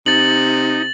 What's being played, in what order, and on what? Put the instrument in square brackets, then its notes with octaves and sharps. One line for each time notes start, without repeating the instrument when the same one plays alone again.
[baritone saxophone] C3 [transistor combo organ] D#4 [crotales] A6 F#7